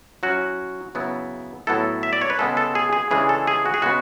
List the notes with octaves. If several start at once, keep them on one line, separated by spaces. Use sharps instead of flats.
F#3 C#4 E4 F#4
C#3 F#3 B3 E4
A2 F#3 B3 E4 A4
E5
D5
C#5
B4
C#3 G#3 B3 A4
A4
G#4
G#4
C#3 E3 G#3 D4 G#4
A4
G#4
F#4
G#4
C#3 G#3 B3 F#4